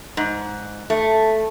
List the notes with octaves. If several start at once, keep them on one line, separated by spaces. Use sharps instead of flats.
G#2
A3